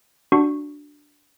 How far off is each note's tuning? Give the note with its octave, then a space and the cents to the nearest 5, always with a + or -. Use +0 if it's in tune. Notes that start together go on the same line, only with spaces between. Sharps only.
D4 +0 F#4 +0 C#6 -10